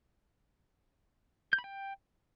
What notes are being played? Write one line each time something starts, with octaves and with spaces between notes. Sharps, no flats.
G6
B5
G5